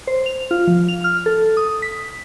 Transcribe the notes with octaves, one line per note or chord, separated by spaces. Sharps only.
C5
F7
F4
F3
F7
F6
A4
D#6
B6